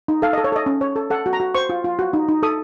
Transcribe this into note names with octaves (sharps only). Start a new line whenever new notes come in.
D#4
A4 F5
A4 D#5
C#5
A4 D#5
C#4
C#5
A4
A4 F#5
F#4
A#5
F#4
C5 C#6
F4
F4
F#4
D#4
D#4
A4 D#6